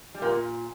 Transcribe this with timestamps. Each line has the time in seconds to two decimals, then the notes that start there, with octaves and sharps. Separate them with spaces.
0.15 G3
0.22 A#2 A#3